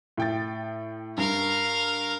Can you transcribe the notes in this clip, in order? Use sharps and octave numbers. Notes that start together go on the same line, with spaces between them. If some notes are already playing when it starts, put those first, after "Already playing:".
A2 G5 A6
G2 A#4 F5